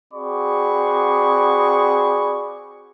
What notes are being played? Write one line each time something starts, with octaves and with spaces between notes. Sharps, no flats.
C4 F#4 G#4 D5 B5 C#6